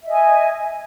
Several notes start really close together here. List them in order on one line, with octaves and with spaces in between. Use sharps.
E5 D#5 G#5